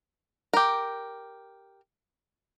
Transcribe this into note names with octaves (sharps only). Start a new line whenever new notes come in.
G4 A#4